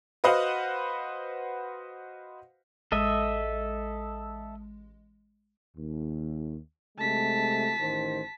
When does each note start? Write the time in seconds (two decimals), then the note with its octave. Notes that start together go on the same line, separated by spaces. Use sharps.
0.24 F#4 B4 C5 D#5 F5 F#5
2.92 A1 G#3 A4 D#5 E5
5.77 D#2
6.98 C3 G#3 A3 A5 B6
7.79 A1 D#3 C5